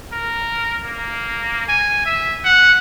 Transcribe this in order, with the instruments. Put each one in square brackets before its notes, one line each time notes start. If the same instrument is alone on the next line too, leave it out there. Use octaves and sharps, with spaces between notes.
[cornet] A#4
A#3
G#5
E5
F#5